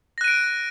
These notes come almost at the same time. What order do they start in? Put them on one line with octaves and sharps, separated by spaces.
A#6 F#6 D#7 D7